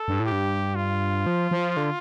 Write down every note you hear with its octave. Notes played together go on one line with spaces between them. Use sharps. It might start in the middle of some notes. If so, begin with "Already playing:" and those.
Already playing: A4
G2
A2
G4
G2
F4
F3
F3
D3